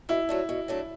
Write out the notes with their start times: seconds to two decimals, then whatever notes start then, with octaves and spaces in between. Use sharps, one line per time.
0.09 B2 E4
0.29 F#3 A3 D4
0.49 B2
0.68 F#3 A3 D4